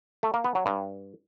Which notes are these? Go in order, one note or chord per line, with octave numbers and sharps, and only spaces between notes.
A3
A#3
B3
F#3
G2